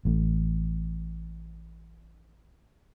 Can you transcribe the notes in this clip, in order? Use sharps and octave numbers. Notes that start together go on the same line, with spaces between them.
A1 A2